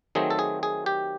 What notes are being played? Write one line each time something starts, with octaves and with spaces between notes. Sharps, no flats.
D#3 F#3 A3 C4 G#4
A4
G#4
G#4
G4